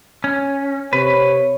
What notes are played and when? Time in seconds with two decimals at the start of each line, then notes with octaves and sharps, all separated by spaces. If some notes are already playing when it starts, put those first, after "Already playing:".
0.24 C#4
0.93 C3 B4 C#5